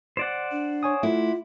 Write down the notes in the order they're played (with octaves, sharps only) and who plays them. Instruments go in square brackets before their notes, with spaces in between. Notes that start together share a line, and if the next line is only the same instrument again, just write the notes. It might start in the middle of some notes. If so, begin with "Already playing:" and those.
[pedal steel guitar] C5 D5 F#5
[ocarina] D4
[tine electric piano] C#5 G#5 D#6
[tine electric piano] A3 [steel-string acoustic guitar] E4 [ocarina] F4